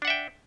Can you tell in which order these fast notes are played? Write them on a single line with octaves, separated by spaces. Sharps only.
D4 F#5 E5 G5